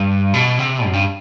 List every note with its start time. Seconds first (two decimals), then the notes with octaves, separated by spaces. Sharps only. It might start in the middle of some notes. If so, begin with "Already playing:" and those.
Already playing: G2
0.34 B2
0.59 C3
0.85 F#2
0.93 G2